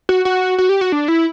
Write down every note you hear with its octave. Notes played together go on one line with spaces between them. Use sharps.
F#4
F#4
F#4
G4
F#4
D4
E4